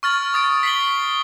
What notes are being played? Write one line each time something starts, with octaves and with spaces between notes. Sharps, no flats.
C#6 F6 A6 F#7
D#6 A6 D7
B6 C7 F#7 G7